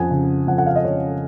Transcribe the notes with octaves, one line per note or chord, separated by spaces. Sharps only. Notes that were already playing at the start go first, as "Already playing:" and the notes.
Already playing: F2 F#5 G#5
C#3
F2 F#5
F#5
F5
D#5
C#3 C#5